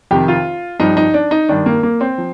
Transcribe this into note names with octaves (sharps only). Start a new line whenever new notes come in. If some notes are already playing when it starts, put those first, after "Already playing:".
F2 C3 D#3 G4
F4
G2 F3 D#4
D#4
D4
D#4
G2 D#3 D4
A#3
A#3
C4
F3